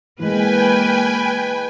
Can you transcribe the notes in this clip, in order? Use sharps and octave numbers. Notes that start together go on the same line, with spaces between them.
E3 G#3 A#3 B4 G5 G#5